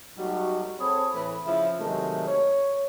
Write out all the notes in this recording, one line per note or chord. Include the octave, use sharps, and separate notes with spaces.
F#3 G3 A3 D#4 F#4
C4 G#4 A4 C#5 B5
A2 E3 B5
C#3 F3 E4
C3 D#3 F#3 G#3 A3
C#5